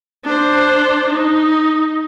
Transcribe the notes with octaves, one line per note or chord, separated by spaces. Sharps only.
D4 C5
D#4